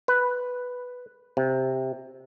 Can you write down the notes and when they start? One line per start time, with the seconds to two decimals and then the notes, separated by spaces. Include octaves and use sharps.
0.08 B4
1.37 C3